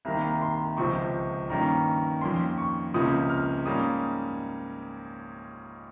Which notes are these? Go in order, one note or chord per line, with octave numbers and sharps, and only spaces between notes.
C2 C3 D#3 A#3 A#5
C6
C#2 C3 F3 C4 C#6
G2 D#3 A#3 C#4 A#5
F2 D#3 A#3 C#4 C6
C#6
C#2 C3 F3 A#3 C#4 D#6
F6
G#2 G3 A#3 C#4 D#6